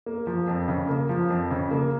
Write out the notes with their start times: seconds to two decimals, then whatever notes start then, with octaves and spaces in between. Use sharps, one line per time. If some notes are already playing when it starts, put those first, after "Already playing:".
0.06 A#3
0.27 F3
0.48 F2
0.68 C#3
0.89 A#3
1.09 F3
1.30 F2
1.51 C#3
1.71 A#3